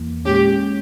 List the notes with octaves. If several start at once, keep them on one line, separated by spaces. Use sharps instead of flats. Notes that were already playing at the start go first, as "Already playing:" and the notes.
Already playing: E2 E3 A#3
A#2 G#3 C#4 G4